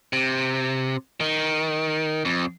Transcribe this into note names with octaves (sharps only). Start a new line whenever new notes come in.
C3
D#3
F2